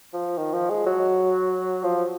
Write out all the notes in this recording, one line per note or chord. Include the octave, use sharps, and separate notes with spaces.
F3
D#3
F3
G#3
F#3
F3